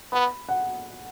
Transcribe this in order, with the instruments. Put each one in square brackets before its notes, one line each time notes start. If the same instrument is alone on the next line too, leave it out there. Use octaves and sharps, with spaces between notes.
[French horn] B3 [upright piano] B5
[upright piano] F#5